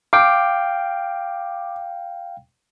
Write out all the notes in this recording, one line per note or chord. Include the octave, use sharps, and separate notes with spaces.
F5 G5 D6